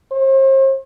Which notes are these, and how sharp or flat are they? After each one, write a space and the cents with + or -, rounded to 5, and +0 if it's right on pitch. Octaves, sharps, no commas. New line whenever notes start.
C5 +40